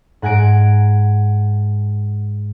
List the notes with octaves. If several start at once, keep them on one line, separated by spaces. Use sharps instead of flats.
G#2 F#5 G#5 A#6 D7